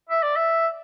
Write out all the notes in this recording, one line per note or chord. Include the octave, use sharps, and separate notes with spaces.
E5
D5
E5